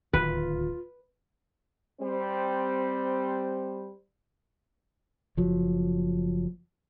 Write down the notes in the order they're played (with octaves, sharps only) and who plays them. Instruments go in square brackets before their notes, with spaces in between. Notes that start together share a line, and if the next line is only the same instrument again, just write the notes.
[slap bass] D1 D#2 [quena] F4 [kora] B4
[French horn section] G3 C4 C5
[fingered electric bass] F#1 F3 F#3